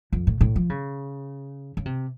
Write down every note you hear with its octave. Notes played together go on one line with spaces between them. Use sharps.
F2
A2
A2
F3
C#3
C#3
C3